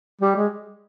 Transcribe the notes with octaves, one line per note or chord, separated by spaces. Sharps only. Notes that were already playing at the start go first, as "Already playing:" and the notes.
G3
G#3